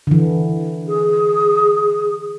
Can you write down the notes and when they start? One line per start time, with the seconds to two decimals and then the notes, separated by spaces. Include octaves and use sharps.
0.07 D3 E3
0.87 G#4